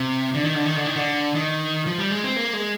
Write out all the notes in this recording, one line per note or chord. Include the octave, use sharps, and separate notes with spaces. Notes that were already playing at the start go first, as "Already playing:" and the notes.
Already playing: C3
D3
D#3
D3
D#3
D3
D#3
D3
D#3
F3
G3
G#3
C4
A#3
G#3